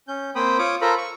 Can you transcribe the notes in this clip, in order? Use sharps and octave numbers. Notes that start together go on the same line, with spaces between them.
C#4 G6
A#3 C4 C5 G5 B5 D#6
F4 C#5 D6 D#6
F4 A4 A#4 C5 A#5 B5
C#6